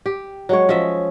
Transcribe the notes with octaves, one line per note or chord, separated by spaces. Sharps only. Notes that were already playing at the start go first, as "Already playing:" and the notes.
G4
F#3 G#3 C#5
F3 C#4 D#5 E5